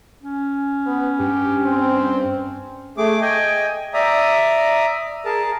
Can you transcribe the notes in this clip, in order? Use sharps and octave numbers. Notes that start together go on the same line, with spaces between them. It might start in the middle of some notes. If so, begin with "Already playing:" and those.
C#4
B3
G2 G4
C4
A3 G#4 D6
D#5 G5 G#5
D5 E5 A#5 D#6
G#4 A#4 A5